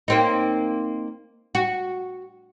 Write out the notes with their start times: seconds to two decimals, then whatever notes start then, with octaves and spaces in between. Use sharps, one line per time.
0.08 A#3 C4 D#4
1.55 F#4